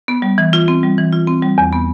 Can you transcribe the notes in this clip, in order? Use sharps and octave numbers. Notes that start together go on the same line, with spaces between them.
B3
G3
E3
F4
C4
G3
E3
F4
C4
G3
E2
B3